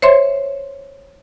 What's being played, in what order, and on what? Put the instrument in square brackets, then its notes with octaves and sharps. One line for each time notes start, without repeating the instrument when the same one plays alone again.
[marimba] C5 C#5 E5 C6